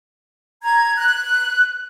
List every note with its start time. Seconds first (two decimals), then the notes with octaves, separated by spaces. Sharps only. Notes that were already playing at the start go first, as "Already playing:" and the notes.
0.62 A#5 G#6
0.97 F#6